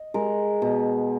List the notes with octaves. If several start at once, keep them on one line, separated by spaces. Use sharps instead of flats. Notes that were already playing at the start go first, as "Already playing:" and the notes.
Already playing: D#5
G#3 A#4
B2